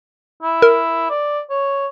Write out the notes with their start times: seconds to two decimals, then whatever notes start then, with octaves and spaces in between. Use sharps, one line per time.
0.43 E4
0.62 A#4
1.10 D5
1.50 C#5